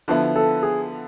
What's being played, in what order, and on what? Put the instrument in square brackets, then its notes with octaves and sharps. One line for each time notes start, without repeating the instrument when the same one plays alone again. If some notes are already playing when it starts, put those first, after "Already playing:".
[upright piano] D3 F3 B3 E4
[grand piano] A4
G#4